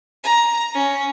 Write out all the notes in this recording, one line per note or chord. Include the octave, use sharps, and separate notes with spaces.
A#5
C#4